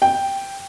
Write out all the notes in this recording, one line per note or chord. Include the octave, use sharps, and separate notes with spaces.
G5